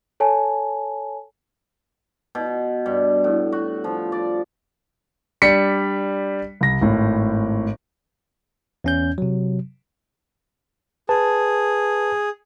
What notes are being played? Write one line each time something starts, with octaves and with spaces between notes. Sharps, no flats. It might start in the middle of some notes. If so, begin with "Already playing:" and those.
A4 C#5 G#5 A5
B2
G2
A2
F#4
F3
D5
G3 D4 B6 C#7
C2 A#6
G#1 A2
E2 C#4 G6
C3 F#3
G#4 B4 A5